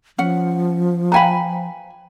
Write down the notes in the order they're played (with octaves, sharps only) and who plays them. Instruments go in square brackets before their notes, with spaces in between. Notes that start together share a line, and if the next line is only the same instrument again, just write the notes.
[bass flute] F3 [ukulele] C#4 F#5
[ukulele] B4 G#5 B5 [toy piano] F5 G5 A#5